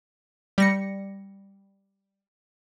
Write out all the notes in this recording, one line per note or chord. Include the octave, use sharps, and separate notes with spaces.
G3 A#6 C#7